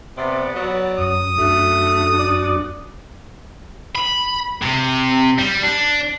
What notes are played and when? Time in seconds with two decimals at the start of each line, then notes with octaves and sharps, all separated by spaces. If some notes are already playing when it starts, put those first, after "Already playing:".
0.17 C3 B3 D5
0.55 F#3
0.98 F#2 D#6
1.38 F#2 A3 D4 F#4
2.19 D5
3.95 B5
4.62 C3
5.38 G3
5.63 D4